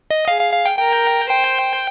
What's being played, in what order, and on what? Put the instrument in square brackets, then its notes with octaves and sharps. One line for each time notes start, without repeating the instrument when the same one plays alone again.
[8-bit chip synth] D#5
[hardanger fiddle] G#4 [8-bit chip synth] F5
[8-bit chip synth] F5
F5
G5
[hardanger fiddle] A#4 [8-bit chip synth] G5
[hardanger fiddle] C5 [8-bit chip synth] G5